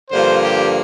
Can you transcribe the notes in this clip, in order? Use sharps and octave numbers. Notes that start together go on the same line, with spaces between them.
G2 D3 F3 A#3 C5
G4